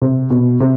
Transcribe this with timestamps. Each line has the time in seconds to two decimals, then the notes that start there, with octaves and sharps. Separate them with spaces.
0.02 C3
0.30 B2
0.60 C3